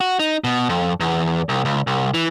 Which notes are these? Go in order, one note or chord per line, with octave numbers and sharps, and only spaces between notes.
F#4
D#4
B2
F2
E2
C2
C#2
C2
E3